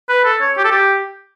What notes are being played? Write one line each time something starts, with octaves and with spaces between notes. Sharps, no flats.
B4
A4
C#5
G4
A4
G4